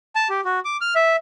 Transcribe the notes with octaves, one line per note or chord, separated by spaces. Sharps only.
A5
G4
F#4
D6
F6
E5